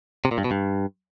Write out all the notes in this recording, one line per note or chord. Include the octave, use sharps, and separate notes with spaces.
C3
A#2
G2
B2
G2